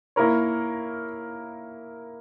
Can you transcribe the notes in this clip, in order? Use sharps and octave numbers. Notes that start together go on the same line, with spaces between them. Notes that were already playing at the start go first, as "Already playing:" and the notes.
A#3 E4 A#4 C#5